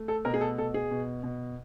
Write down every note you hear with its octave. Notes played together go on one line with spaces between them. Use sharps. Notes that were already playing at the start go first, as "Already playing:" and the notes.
Already playing: A3
A4
B2 A#4
G#4
A4
B2 A4
G#4
B2
B2